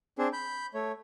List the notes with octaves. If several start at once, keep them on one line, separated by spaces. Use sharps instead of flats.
C4 D4 G#4
B5 G6
A3 C#5